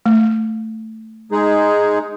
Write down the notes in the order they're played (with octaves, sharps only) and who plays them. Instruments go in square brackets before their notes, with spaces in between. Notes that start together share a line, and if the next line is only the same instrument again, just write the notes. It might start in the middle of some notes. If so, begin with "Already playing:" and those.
[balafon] A3
[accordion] G#3 D#4 G#4